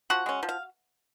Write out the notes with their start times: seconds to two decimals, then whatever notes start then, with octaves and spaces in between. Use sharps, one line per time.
0.10 F3 F#4 F#5
0.26 G#3 C#4
0.43 F3
0.49 F5